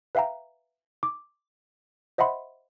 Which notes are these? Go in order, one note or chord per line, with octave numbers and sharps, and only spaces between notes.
B4 E5 F5 G5 A#5
D6
C5 D#5 E5 F#5 B5 C6